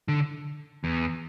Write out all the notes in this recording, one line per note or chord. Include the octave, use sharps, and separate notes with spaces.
D3
E2